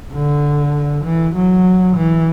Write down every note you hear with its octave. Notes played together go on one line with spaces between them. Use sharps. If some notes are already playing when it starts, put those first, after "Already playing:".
D3
E3
F#3
E3